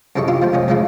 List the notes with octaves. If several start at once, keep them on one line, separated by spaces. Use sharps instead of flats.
F#2 C3 E4 A4 D#5 C#6
D4 E4 F4 G4
F3 A3 C5
C2 F2 C#4 D#5
G#2 D3 F3 A3 A#3 E4